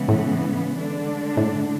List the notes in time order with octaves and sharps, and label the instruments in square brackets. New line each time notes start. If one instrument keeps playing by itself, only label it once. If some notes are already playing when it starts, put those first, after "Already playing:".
Already playing: [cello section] C#3 E3 G#3 B3
[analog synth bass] A2
[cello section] D3 G#3 D4
[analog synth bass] A2